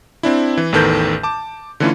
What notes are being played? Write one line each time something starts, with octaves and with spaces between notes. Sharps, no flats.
C4 D4 E4
E3
A1 E2 D#3 A4 B4 G6
A5 D6
D3 E3 A3 C#4 E4 F4